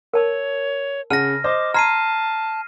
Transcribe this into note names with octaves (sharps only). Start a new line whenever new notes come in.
A#4 C#5 A5 E6
C#3 F#5 A5 F6 A#6 D#7
C5 D#5 D6
A5 A#5 C6 F6 G#6 C7 D#7